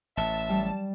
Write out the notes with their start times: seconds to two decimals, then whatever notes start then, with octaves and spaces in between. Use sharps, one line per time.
0.17 A1 E5 A5
0.49 G3